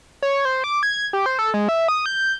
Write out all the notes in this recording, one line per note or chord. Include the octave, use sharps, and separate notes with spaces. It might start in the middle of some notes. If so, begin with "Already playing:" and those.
C#5
C5
D6
G#6
G4
C5
A4
G#3
E5
D#6
G6